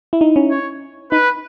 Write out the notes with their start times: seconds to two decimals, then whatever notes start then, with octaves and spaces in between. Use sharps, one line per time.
0.13 E4
0.21 D#4
0.36 C#4
0.51 C#5
1.11 D#4 B4